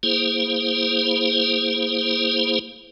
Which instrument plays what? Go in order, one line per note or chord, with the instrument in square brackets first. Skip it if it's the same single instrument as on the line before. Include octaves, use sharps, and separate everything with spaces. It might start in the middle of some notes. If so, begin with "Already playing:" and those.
[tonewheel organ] A#3 E4 G#4 C5